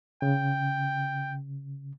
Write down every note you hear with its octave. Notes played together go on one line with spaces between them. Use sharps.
C#3 G5